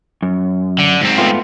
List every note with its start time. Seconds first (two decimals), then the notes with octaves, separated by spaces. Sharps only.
0.23 F#2
0.79 D3
1.01 G#2 C4
1.18 A3 B3 F4